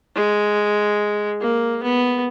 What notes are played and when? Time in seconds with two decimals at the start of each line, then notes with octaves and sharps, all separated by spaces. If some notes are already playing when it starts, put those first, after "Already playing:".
0.16 G#3
1.41 A#3
1.83 B3